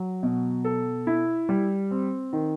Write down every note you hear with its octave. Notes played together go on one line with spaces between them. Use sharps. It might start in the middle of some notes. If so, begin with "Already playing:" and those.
Already playing: F#3
B2
A4
E4
G3
C4
D#3